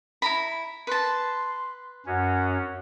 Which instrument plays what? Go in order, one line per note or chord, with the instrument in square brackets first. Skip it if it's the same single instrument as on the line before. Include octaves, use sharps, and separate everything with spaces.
[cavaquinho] E4 A#5 B5
[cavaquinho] B4 A5 [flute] C6
[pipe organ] F#2 C#4 [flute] F#4